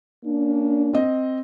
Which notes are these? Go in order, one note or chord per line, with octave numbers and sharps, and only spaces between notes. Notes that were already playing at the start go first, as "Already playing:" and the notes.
A#3 C#4 D4
C4 D#5